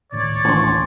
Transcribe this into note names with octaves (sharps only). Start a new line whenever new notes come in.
C#2 A2 D#3 C#5 D5
A1 D2 D4 C6 C#6